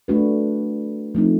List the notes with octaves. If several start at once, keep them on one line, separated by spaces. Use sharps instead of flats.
A3 D4 F#4 B4
F3 A3 C4 D#4